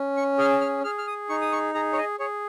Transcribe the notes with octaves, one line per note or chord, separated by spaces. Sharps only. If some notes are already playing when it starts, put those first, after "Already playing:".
Already playing: C#4
C#6
G#4 F6
F6
G#4 F6
F6
D#6
D#4 C#6
D#6
C#6
G#4 A#5
C#5
D#5
G#4 C#5